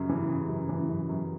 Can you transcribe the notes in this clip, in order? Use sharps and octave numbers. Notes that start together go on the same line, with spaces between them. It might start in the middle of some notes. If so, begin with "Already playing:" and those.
Already playing: F#2 C#3
E3
C#3
F#2
E3
F#2
F#2